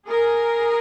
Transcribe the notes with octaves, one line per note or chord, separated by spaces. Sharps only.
G#4 A#4